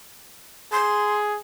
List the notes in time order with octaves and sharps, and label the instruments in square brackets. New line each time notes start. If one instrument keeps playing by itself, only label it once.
[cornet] G#4 [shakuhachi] C6